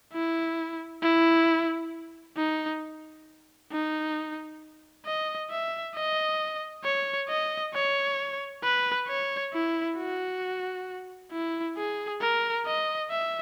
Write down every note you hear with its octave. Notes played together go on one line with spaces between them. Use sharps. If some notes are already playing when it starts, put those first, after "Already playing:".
E4
E4
D#4
D#4
D#5
E5
D#5
C#5
D#5
C#5
B4
C#5
E4
F#4
E4
G#4
A#4
D#5
E5